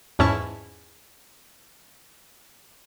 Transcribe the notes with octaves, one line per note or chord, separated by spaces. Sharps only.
E2 G#2 C#4 E4 A5 C#6